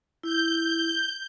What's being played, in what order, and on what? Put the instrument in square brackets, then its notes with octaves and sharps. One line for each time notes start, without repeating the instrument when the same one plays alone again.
[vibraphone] E4 [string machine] G6